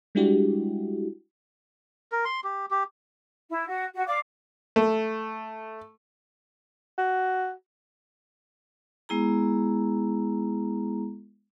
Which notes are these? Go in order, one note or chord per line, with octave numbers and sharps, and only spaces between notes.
G3 G#3 D4 E4 F#4 G4
A#4
C6
G4
G4
E4
F#4
F#4
D5 F5 D6
A3
F#4
G#3 B3 E4 G#4 A#5